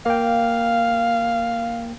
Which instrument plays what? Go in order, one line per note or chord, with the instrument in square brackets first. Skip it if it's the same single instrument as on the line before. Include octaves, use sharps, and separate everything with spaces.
[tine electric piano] A#3 G5 [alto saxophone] F5